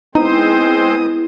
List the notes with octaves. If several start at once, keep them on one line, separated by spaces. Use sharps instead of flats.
G#3 B3 C4 D#4 E4 C5 D#6